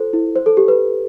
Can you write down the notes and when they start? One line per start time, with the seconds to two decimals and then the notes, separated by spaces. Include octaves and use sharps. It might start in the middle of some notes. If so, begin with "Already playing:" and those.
Already playing: F4 A4 C5
0.13 E4
0.36 C5
0.46 A4
0.57 G4
0.68 B4